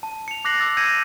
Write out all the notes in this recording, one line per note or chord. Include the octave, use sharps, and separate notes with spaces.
A5
C#7 F7
D6 F#6 A#6 C7 F#7
D6 E6 A6
E6 G6 G#6 A#6 C#7 D#7